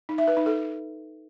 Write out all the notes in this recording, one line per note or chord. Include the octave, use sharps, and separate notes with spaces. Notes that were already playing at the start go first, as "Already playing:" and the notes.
D#4
E5
B4
D#4
A4